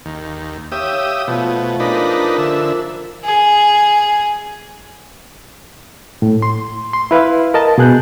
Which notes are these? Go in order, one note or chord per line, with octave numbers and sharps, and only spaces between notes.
D#2
G4 C#5 E5 F5 D#6
B2 F3 A3
D4 D#4 G#4 A#4 B4 A#5
D3 E5
G#4
A2
C6
C6
E4 B4 F5
A#4 D#5 A5
B2 G#4 F#6 G6